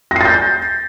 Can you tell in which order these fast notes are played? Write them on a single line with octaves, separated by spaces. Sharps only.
A#6 C7 A6 G6